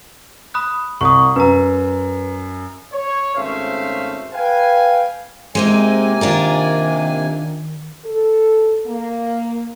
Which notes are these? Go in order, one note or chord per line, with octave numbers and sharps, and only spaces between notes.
B5 D#6 F#6
C2 C#6 D#6
F#2 B4 A#5
C#5
G#1 A3 C#4 C5 E5 F5
B4 F5 G5 G#5
C3 G#3 A#3 C4 D#4 G#5
D#3 D4 F4 A#4
A4
A#3